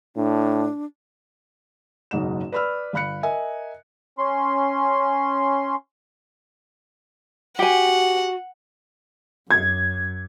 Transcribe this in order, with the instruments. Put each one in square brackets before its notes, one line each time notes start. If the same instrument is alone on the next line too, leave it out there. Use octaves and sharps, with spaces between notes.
[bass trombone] A2 [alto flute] D4
[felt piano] F#1 B1 G#2 D#5 E7
B4 D5 B5 E6 F6
G1 F5 B5 F#6 C#7
A#4 D#5 E5 G#5
[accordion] C#4 C6
[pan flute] F#4 [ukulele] G4 G#5 [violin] F#5
[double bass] F#2 [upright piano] G#6